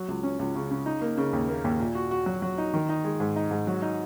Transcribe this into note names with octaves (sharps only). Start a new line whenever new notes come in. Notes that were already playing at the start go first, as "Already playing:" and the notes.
Already playing: F#3
C#2
C#4
C#2
C#3
C#3
D#4
A#3
C#3
D#2
A#3
D#2
A#2
F#4
F#4
F#3
F#3
D#4
D#3
D#4
G#3
G#2
D#4
G#2
F#3
D#4